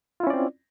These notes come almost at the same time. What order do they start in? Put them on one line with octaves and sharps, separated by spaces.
F4 E4 C#4 D5 C4